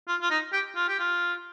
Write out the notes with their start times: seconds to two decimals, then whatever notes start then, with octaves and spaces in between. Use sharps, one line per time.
0.08 F4
0.21 F4
0.31 D#4
0.53 G4
0.75 F4
0.88 G4
0.99 F4